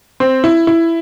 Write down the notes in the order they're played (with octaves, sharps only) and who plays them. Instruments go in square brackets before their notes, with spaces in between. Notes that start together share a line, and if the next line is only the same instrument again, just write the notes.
[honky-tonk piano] C4
E4
E4